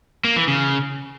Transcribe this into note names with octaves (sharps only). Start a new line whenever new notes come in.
A#3
E3
C#3